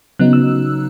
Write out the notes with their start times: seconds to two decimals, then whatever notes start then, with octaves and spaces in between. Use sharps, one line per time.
0.19 C#3 F#3 B3 D#4 F#6
0.33 E6